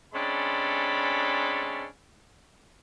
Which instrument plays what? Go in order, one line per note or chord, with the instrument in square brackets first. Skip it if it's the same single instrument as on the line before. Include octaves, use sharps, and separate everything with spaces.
[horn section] C3 G#3 C#4 D4 A4 B5